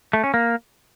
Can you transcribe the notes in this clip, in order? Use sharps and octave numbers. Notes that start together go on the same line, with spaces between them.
A3
C#4
A#3